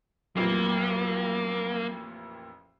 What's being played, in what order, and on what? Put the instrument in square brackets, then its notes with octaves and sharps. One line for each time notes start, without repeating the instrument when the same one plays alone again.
[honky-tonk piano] A1 F2 A#2 [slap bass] F#3 [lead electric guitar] A#3